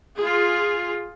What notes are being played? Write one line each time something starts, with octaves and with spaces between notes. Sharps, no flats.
F4 G#4